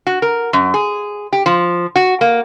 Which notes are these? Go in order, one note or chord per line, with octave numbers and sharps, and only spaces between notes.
F#4
A#4
F#2
G#4
G4
F3
F#4
A#3